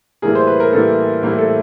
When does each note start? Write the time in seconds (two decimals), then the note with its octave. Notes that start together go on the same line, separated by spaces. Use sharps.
0.22 A2 E3 G3 A#3 G#4 A#4
0.35 C5
0.47 B4
0.60 A#4
0.73 A2 E3 G3 A#3 A4
1.23 A2 E3 G3 A#3
1.38 A4